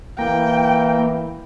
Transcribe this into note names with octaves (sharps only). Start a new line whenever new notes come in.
E3 A#3 G5